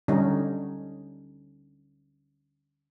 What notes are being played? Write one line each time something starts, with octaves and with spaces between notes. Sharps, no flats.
D3 G3 C#4 D#4